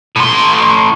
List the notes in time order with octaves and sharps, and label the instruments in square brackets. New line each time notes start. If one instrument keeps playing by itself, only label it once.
[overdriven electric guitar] A2 C6